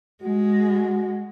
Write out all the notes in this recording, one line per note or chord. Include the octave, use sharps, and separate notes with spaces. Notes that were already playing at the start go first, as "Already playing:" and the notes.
G#3 F#4